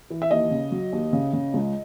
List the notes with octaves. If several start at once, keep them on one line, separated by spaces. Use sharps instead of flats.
E3
E5
D#2 D#5
C#3
F#3
D#2
C#3
C#3
C#2